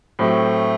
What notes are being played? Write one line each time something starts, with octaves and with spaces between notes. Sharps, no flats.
A2 F#3 A3 C4 G4